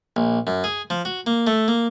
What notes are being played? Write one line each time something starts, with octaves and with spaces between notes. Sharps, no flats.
A#1
F#2
G#4
F3
F#4
A#3
A3
A#3